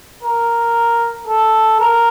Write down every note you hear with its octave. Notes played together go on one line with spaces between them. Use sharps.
A#4
A4
A#4